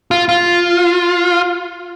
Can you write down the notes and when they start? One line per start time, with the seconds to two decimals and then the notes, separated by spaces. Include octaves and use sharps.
0.11 F4
0.29 F4